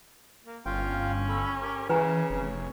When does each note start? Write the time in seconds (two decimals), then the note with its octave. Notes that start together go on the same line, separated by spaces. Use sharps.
0.46 A#3
0.66 G1 C#4 F4 F5 G5
1.29 A4 B5
1.62 G4 A#4
1.89 C#3 E3 B4 C#5 G#5 A#5
2.30 F1